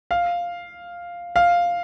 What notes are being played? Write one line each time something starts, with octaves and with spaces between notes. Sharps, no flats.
F5
F5